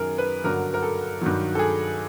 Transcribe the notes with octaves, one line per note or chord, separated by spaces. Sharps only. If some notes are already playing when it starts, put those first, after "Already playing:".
Already playing: F#2 D#3 F#3 G#4 A#4
B4
G2 D3 F#3 A#4
A#4
A4
G2 D#3 F#3
A4
G#4